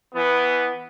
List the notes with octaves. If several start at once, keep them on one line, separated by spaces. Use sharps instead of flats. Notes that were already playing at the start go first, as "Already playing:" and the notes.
E3 B3